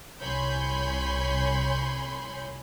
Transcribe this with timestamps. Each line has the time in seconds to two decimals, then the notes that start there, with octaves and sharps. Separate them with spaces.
0.22 C2 C#5 G#5 B5 C6 G6